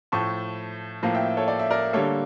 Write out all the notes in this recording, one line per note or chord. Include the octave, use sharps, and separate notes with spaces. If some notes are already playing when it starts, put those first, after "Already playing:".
A2 F3 A3 A5 C#6
A2 F3 A#3 F5 A5
E5 G5
A4 C#5
D5
E5
A#4 D5
D3 G3 A#3 A4 C#5